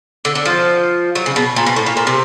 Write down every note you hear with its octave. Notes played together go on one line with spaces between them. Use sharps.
D3
D3
F3
F#3
C#3
B2
A#2
B2
A2
A#2
A#2
C3